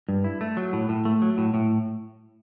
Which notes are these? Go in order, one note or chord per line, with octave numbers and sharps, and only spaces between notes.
G2
E4
A3
F#3
A2
A2
A3
F#3
A2
A2